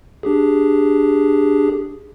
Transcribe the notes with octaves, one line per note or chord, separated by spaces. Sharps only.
D4 G4 G#4